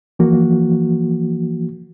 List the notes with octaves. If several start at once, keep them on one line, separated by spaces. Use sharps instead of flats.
E3 F3 A#3 F#4